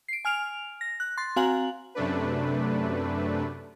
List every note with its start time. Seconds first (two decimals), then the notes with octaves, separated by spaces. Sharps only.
0.09 C7 D7
0.25 G#5 F6 D7 F7
0.81 A#6
1.00 F#6
1.18 C6 A6
1.36 C4 F#4 F5 G#5 A#5 F#7
1.95 F#2 C3 A3 D4 B4